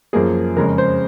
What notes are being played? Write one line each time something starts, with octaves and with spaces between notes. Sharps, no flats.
F#2 F3 A#3 G#4
F2 C#3 G#3 A#4
C5